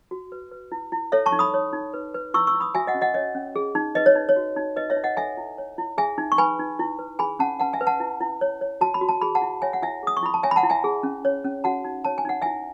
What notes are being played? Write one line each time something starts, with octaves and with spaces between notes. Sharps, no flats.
F#4
B4
B4
E4
E4
A4 C#5 E5
A5 C#6
D#4
B5 D#6
C#5
D#4
B4
B4
E4 C#6 E6
C#6 E6
E4
B5 D#6
F#4 E5 G#5
D#5 F#5
C#4
D#5 F#5
C#5 D#5
C#4
G#4
D#4
B4 D#5
C#5
D#4
C#5
F#4
D#4
B4 D#5
C#5 E5
D#4
D#5 F#5
A4 E5 G#5
E4
C#5
E4
G#4 E5 G#5
D#4
C#6
B4 G#5 B5
D#4
E4
B4
G#4 G#5 B5
C#4 F#5 A5
B4 F#5 A5
E5 G#5
B4
F#5 A5
E4
E4
C#5
C#5
F#4 A5
B5
F#4
A5
G#4 B5
F#5 A5
E4
C#5 E5 G#5
F#5
E4 E5 G#5
G#4 D#6
C#6
E4 B5
A5
C#5 E5 G#5
B5
F#5 A5
E4
E5 G#5
G#4
C#4
C#5
C#4
F#4 F#5 A5
D#4
C#5 A5
G#5
D#4 F#5
E4 E5 G#5